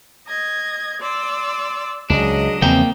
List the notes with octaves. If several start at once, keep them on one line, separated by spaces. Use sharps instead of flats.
D#5 G#6
D5 C6 E6
C#2 F#3 D4 G#4 D#5 D#6
E2 C#3 F3 A#3 C4 G5